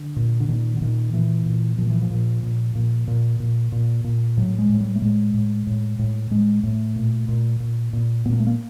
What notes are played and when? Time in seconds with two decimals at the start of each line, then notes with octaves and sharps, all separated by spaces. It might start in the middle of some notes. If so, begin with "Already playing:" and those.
Already playing: D3
0.16 A#2
0.40 D3
0.48 A#2 D#3
0.77 D3
0.81 A#2 D#3
1.13 A#2 E3
1.46 A#2
1.78 A#2 F3
1.90 E3
2.02 F3
2.11 A#2
2.43 A#2
2.75 A#2
3.08 A#2
3.40 A#2
3.72 A#2
4.04 A#2
4.37 A2 F#3
4.58 G#3
4.69 A2
4.80 G3
4.95 A3
5.02 A2 G#3
5.34 A2
5.67 A2
5.99 A2
6.31 A2 G#3
6.63 A2 A3
6.96 A#2
7.28 A#2
7.60 A#2
7.93 A#2
8.25 A#2 B3
8.32 A#3
8.40 A3
8.46 A#3